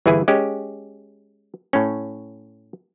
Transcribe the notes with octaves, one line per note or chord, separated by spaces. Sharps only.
G1 E3 E4 G#4 G#5
G#3 C#4 G4
A2 C#4